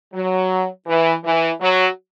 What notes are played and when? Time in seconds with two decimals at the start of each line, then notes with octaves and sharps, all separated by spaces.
0.14 F#3
0.88 E3
1.25 E3
1.61 F#3